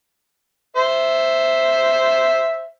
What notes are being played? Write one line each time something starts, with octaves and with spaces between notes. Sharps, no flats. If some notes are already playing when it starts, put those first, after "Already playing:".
C5 E5